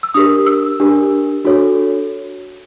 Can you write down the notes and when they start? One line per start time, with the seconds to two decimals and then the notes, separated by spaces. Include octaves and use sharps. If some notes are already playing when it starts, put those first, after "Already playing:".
0.03 E6
0.14 D4 G4 A#4 D#6
0.46 E6
0.80 D4 G4 A#4
1.45 D4 F#4 A4 C#5